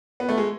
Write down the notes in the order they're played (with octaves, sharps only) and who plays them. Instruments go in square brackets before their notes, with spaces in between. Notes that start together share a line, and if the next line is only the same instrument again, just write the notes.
[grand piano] B3
A3
G#3